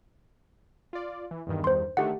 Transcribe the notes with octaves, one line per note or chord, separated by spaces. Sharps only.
F4 D5
E3
E2 G2 D#3
C5 C6
D3 D#3 A3 G4 F#5